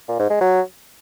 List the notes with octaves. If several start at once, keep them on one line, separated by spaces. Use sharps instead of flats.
A#2
G#2
G#3
F#3